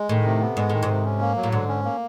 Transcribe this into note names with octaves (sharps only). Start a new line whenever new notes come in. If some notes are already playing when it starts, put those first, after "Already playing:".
Already playing: G#3
A2 D#3
C3
B3
G#2 G#3
A2 D#3
G#2
C3
C#4
A#3
F#3
A2
G#2 D3
C#4
A#3